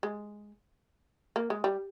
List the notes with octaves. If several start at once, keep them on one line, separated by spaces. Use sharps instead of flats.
G#3
A#3
G#3
G3